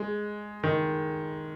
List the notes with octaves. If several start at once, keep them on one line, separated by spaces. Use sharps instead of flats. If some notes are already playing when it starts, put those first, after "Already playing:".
Already playing: G#3
D#3